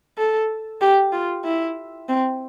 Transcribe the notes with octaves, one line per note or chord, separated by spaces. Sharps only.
A4
G4
F4
E4
C4